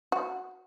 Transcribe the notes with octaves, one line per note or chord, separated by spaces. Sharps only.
F#4